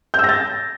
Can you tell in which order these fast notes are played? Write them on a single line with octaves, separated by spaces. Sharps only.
G6 E6 A#6 A6